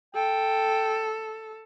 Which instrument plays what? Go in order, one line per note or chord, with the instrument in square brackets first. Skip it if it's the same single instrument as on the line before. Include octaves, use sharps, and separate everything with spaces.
[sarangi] A4 [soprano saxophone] G5